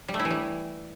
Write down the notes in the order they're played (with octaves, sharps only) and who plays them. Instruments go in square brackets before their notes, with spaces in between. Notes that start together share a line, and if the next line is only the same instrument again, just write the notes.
[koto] G3
A3
E4
E3
G3